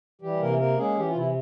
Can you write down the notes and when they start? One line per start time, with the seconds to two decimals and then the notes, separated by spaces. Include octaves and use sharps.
0.21 E3 G3 G4
0.40 C3 A#3 A#4
0.59 A#3 A#4
0.78 G#3 C#4 G#4
0.96 E3 G4
1.07 F4
1.15 C3 E4